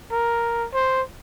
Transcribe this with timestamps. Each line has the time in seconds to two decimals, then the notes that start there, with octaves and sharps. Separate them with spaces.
0.12 A#4
0.74 C5